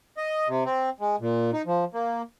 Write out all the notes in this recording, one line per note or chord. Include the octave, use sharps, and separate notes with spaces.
D#5
C3
C4
G#3
A#2
D#4
F3
A#3